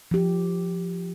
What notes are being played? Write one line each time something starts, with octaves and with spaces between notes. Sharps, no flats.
F3 G4